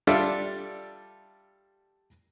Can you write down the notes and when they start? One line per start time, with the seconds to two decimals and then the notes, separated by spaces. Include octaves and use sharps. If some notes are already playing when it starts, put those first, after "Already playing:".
0.07 G3 D4 F4 A4 D5 E5